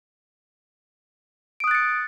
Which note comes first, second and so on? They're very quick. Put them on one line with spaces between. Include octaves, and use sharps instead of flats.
D7 D#6 F#6 A6 C#7